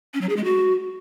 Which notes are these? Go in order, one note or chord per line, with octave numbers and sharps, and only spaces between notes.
C#4
F#3
G#4
G#3
F#4